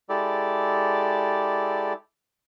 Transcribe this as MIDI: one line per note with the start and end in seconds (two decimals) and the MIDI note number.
0.09 1.93 56
0.09 1.93 64
0.09 1.93 67
0.09 1.93 69
0.09 1.93 74